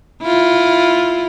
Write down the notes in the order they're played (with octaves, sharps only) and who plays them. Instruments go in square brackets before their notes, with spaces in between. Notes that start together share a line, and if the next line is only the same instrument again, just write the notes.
[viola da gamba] E4 F4